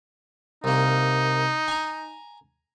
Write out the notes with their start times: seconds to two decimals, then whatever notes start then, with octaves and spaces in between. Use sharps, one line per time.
0.64 C2 A#3 D#4
1.68 G#5 A#5